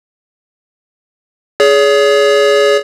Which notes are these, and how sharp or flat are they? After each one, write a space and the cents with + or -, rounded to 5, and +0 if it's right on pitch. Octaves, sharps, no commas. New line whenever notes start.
G#4 +10 C#5 +40